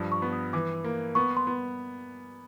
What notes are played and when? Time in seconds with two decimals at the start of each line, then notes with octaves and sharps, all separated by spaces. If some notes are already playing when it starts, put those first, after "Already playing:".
Already playing: G2 F3
0.12 C#6
0.22 B3
0.32 D#6
0.53 E3 D6
0.84 A#3
1.15 B3 C#6
1.37 C6
1.47 B3